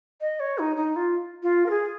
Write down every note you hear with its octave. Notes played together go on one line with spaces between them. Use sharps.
D#5
C#5
D#4
D#4
F4
F4
A#4
G#4